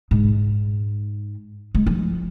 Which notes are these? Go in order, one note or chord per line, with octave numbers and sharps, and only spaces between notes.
G#2
G#3
F3